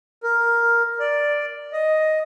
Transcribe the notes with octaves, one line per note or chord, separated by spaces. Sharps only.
A#4
D5
D#5